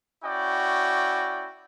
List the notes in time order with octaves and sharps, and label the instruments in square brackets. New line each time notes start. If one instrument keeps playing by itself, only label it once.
[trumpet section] C#4 E4 F#4 D5 G5